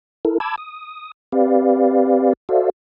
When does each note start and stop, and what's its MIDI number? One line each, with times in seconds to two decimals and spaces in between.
0.25 0.38 64
0.25 0.38 69
0.25 0.38 70
0.40 0.56 81
0.40 0.56 83
0.40 0.56 86
0.40 0.56 88
0.40 0.56 92
0.58 1.12 87
1.32 2.33 60
1.32 2.33 67
1.32 2.33 71
1.32 2.33 74
1.32 2.33 77
2.49 2.70 66
2.49 2.70 69
2.49 2.70 72
2.49 2.70 74
2.49 2.70 76
2.49 2.70 77